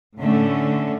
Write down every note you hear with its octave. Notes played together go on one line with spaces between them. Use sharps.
A2 D3 A3 C#4